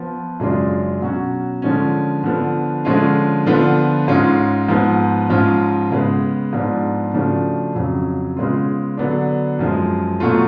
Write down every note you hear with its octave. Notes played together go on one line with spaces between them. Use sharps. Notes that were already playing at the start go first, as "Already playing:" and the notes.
Already playing: F3 B3 F4
F#2 C#3 G#3 D4 F4
B2 F#3 C#4 F#4
D3 F3 G#3 C#4
D3 F3 B3
D3 F3 G#3 C#4 F4
D3 F3 B3 F4
G#2 G#3 C#4 F4
G#2 F3 B3
G#2 F3 G#3 C#4 F4
C#3 G#3 B3
G#2 F3 B3 D4
C#3 F3 A3 D4 F#4
F2 C#3 F#3
C#3 G#3 B3 F4
D3 F#3 B3 D4
F#2 F3 G#3
B2 F#3 A3 F4